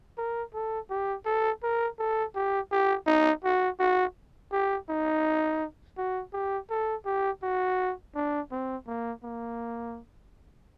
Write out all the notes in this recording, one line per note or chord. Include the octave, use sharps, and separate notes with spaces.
A#4
A4
G4
A4
A#4
A4
G4
G4
D#4
F#4
F#4
G4
D#4
F#4
G4
A4
G4
F#4
D4
C4
A#3
A#3